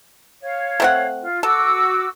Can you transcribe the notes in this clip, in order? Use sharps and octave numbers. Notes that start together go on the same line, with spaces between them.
C#5 F5
A3 C4 F#5
F4
F#4 A4 D6 E6